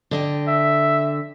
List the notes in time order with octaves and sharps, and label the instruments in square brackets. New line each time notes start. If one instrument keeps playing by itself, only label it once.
[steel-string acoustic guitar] D3 D#5 G5
[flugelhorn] E5